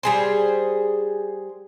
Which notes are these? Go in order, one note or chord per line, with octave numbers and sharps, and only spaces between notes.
G3 G#4 C5